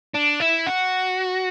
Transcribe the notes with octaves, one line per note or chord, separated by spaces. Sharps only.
D4
E4
F#4